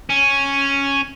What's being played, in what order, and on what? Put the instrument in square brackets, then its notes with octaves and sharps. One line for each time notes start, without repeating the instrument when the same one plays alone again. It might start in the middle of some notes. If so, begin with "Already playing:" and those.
[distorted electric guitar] C#4